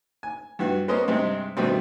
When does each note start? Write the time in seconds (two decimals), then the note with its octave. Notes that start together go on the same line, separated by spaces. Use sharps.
0.23 G#5
0.59 G2 E3 F#4
0.88 A#3 B3 C#4 A#4 C5 D#5
1.08 G2 C3 G#3 C4
1.57 G2 B2 D#3 G3 A3 C4